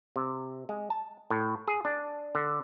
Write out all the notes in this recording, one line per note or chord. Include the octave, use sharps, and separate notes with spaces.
C3
G#3
A5
A2
G#4
D4
D3